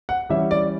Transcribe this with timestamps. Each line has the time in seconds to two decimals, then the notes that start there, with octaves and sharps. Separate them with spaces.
0.09 F#5
0.29 E3 G3 C#4 E4 E5
0.51 D5